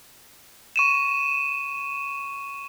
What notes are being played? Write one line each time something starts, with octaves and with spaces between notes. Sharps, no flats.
C#6 D#7 E7